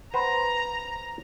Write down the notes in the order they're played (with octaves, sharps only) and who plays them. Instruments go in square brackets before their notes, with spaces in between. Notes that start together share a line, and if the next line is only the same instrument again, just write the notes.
[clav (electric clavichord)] B4 C5 F#5 [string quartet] A#5